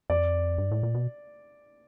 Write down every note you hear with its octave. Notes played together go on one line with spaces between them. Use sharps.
F2 D5
G2
A2
A#2
B2